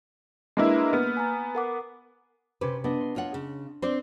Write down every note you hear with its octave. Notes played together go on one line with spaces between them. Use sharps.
G#3 A#3 D4 E4 B4
A#3 B3 F6
G#5 A#5
A#4 F#5 D6
C3 C#4 B4 C5 D6
B3 D4 D#5
C6
F4 C#5 F#5
C#3
C4 D4 C5 C6 D6